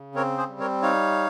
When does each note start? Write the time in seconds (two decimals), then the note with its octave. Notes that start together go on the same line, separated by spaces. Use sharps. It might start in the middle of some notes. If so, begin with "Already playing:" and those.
Already playing: C#3
0.15 C4 A#4 C#5
0.38 G#4 C5
0.49 G3
0.60 A#4 C#5
0.82 D#4 C#5 F5